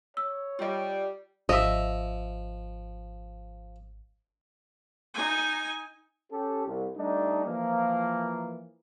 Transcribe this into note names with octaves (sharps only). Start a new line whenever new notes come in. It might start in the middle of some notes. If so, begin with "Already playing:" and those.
C#5 E6
G3 F4 D#5
G#1 F3 D#5 E5
D#4 G#5
C#4 G4 A4
C2
G3 A3 D4 D#4
E3 F3 A#3